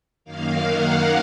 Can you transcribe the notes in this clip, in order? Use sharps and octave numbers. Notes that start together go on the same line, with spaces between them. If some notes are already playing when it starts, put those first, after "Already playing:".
F#2 D#3 A#3 F5
F#5